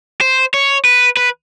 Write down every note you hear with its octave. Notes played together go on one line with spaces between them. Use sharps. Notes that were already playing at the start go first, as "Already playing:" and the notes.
C5
C#5
B4
B4